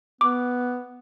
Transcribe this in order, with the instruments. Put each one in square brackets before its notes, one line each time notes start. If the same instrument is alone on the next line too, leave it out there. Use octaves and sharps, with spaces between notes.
[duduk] B3 [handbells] D6